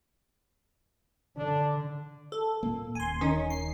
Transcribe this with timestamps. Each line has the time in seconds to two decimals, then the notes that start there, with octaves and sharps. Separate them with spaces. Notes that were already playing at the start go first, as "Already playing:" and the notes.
1.37 D3 D4
2.32 A4
2.63 A#2 A#3
2.95 D#1 G#5 C6
3.21 D#3 C#4 D#4
3.50 C7